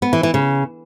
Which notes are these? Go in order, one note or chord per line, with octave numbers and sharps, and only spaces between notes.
B3
E3
E3
C#3